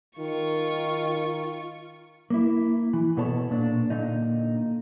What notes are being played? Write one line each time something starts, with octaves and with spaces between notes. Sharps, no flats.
D#3 F4 C#6
A#3 E4
E3
B2 B3 A4 C#5 A5
A#2 D4
A#2 D3 D#4